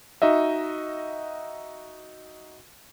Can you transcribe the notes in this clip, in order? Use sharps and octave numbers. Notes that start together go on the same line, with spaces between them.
D#4 F#4 D#5 E5